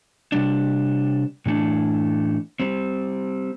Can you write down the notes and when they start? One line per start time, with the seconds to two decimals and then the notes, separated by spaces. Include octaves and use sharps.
0.32 C3 G3 D4
1.46 A2 E3 A3 D4
2.60 G3 C4